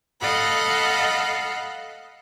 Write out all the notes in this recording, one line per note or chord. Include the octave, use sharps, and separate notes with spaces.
A4 D#5 F5 F#5 B5